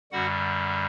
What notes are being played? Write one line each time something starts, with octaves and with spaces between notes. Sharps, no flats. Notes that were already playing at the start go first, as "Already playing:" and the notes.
F#2 D3 G3 F#4 F#5